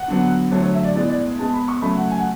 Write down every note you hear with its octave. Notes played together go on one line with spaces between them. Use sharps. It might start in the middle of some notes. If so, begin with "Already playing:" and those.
Already playing: F#5
D3 F#3 B3
D3 F#3 A3 C#5
C#5
E5
D5
A2 G#3 B3 D5
D5
B2 G#3 B3 A5
B5
C#6
C#3 F#3 A3 B5
F#5
G#5
F#5